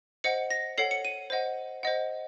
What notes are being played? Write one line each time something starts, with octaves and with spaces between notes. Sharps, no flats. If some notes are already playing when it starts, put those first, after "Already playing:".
C5 D#5 F#5 C#7
A#6
A4 C#5 F#5 C7
C#7
D#7
C5 D#5 F#5
C5 D#5 F#5